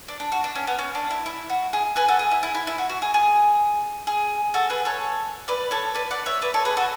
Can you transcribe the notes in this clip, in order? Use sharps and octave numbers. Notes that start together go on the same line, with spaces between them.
D4
D4
F#4
D4
C#4
B3
C#4
D4
E4
E4
F#4
G#4
G#4 B4
F#4 A4
G#4
E4
E4
E4
E4
F#4
F#4
G#4
G#4
G#4
F#4 A4
G#4 B4
A4 C#5
B4 D5
A4 C#5
B4 D5
D5 F#5
C#5 E5
B4 D5
A4 C#5
G#4 B4
F#4 A4